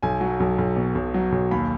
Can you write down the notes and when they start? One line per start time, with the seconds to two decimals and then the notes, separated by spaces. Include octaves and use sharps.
0.03 B1 G#5
0.21 F#3
0.40 B1
0.58 B1
0.76 B2
0.95 B1
1.14 F#3
1.32 B1
1.51 D#2 B5